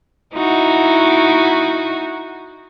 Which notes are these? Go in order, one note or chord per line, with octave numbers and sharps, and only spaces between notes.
D#4 E4 F#4